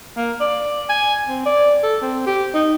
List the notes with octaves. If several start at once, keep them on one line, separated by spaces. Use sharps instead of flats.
A#3
D5
G#5
C4
D5
A4
C4
G4
D#4